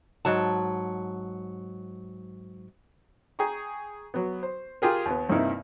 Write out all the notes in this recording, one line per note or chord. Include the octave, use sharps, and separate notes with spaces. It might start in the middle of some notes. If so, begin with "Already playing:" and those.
G#2 F#3 A5
G#4 G5 A#5 C#6
F#3 B3
C5
F4 G4 G#4 A#4
D#2 B3
G2 C3 A#3 D#4 E4